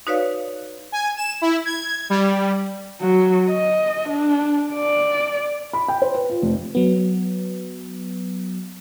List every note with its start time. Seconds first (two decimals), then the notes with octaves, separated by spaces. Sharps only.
0.07 D#4 F#4 B4 C#5 D5 F5
0.92 G#5
1.17 E7
1.41 E4
1.65 G#6
2.10 G3
3.01 F#3
3.50 D#5
4.09 D4
4.74 D5
5.73 B5
5.88 G5
6.02 C5
6.15 B4
6.30 F4
6.42 F1
6.75 F#3 B3